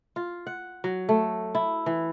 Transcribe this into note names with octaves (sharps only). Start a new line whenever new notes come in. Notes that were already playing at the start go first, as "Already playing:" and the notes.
F4
F#5
F#3
A3
E4
E3